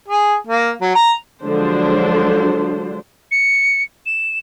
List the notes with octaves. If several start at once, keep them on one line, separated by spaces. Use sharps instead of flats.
G#4
A#3
F#3
A#5
D3 F3 F#3 G#3 D4 C5
C#7
E7